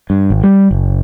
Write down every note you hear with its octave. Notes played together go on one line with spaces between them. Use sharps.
G2
G#1
G3
F#1